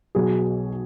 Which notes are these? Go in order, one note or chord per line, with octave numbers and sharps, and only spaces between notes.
B1 B2 F#3 G#4